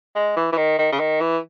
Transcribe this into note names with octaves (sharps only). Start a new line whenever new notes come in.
G#3
E3
E3
D#3
D#3
C#3
D#3
E3